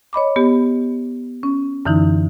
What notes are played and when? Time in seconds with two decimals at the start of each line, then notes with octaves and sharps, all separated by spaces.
0.13 C#5 D#5 B5 D6
0.36 B3 G4
1.43 C#4
1.86 F#2 D3 E3 D#4 E4